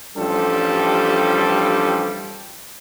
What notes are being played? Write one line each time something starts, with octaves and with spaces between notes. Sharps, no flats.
A1 F3 G3 D4 G4 A4